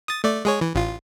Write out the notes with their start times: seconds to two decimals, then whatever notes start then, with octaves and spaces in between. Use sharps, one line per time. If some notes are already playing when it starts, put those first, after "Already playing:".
0.08 D#6 A6
0.24 A3 D5
0.45 G#3 G#4 C#5
0.61 E3
0.75 A1 F4